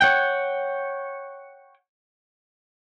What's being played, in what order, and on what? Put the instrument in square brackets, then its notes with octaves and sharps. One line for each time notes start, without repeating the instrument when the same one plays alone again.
[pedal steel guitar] C#5 F#5 G5